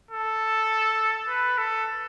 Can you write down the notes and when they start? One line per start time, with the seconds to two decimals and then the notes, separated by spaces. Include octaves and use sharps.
0.11 A4
1.28 B4
1.58 A4